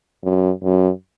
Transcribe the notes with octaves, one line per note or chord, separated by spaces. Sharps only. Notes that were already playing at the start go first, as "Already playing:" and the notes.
F#2
F#2